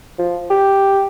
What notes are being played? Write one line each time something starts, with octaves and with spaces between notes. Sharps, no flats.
F3
G4